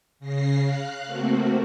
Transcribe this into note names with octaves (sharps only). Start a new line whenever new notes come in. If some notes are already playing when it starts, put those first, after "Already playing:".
C#3 A#6 C7
F5 F#6
A3 A#3 C4 F#4